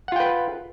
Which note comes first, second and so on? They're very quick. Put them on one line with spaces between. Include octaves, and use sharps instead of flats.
F#5 F4 G5 B4